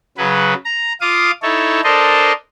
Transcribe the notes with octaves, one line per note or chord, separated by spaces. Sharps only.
C#3 F#3 B4
A#5
F4 F5 D6 D#6
D#4 E4 A4 C#5
D4 A4 A#4 C5 D#5